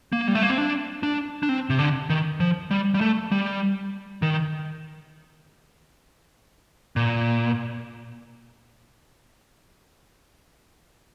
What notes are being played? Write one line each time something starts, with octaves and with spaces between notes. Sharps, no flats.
A#3
G3
A3
A#3
C4
D4
D4
D4
C4
C3
D3
D#3
F3
G3
G3
A3
G3
D#3
A#2